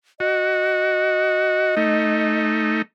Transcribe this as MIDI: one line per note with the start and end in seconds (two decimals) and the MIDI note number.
0.20 1.75 66
0.20 2.46 75
1.77 2.82 57
1.77 2.82 63